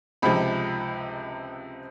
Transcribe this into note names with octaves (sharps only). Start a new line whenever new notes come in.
C#2 C3 F3 G#3 B5